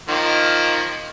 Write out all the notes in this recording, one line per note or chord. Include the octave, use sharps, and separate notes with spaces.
D#3 F3 A#3